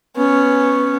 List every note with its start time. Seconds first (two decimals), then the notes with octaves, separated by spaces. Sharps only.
0.16 B3 C#4